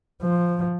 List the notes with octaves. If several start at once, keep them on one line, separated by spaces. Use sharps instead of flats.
F3